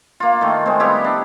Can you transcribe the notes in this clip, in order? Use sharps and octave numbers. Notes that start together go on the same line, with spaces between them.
A#3 F4
D#3 A3
G#3 C4
G3 B3 E4 G4
D4